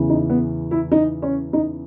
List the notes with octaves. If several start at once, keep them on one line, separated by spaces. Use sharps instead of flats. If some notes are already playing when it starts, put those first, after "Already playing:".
Already playing: E2 C#3 E3
D#4
B3
E4
D#4
C#4
D#4